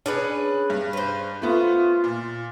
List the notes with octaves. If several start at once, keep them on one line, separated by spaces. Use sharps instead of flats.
C#4 D4 G#4 B4
G2
B4 C5
A3 B3 F4
A#2